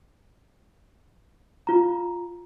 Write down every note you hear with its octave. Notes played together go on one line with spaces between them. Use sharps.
F4 A#5